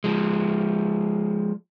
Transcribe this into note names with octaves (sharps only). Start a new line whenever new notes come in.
F3 G#3